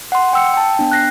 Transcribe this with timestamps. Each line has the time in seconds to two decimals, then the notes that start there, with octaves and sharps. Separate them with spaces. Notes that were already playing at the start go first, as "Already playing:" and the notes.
0.12 F#5 C6
0.33 G5 E6 C#7
0.54 G5 A5
0.77 B3 D4 G5
0.92 F#6 A#6 C7